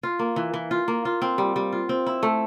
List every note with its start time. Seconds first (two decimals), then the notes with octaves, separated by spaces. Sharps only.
0.03 F4
0.19 A#3
0.36 E3
0.54 E3
0.71 F4
0.88 A#3
1.05 F4
1.22 C4
1.38 G3
1.56 G3
1.73 F4
1.89 C4
2.06 E4
2.23 A3